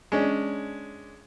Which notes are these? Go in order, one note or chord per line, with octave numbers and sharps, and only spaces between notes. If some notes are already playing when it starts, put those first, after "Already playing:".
G#3 C#4 D4